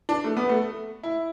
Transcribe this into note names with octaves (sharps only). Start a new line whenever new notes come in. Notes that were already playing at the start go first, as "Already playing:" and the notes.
D4
A3
B3
A3
E4